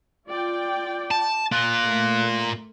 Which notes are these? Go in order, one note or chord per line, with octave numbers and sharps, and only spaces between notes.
F4 D5 G5
A5
A#3 F4 F#6
A3 A#4